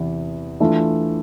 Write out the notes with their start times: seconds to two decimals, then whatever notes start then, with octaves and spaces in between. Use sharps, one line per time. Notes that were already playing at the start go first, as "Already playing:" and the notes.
Already playing: E2 C3 E3
0.60 E3 A3 D4 F4